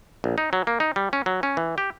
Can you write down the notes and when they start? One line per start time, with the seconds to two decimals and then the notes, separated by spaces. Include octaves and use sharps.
0.24 A#1
0.38 D#4
0.53 F#3
0.67 A#3
0.80 D#4
0.96 G3
1.13 C#4
1.26 F#3
1.43 C#4
1.57 E3
1.78 G4